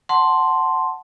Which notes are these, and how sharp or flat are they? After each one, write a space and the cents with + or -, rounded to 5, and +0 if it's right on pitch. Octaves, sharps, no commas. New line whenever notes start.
F#5 +5 A5 +0 C6 +0